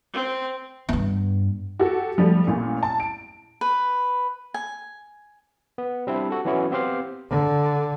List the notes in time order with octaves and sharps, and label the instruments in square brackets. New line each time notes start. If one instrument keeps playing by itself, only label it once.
[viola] C4
[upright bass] G2 B3
[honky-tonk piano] F#4 G4 A4
F3 G3 A3
A1 A#2
A5
D7
[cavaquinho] B4
G#5
[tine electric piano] B3
G3 C4 D4 E4
F#4 A4
E3 F#3 B3 C#4 E4 F#4
B3 C4 G4 C5 F5
[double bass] D3